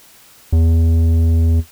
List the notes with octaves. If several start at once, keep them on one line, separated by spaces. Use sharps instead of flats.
E2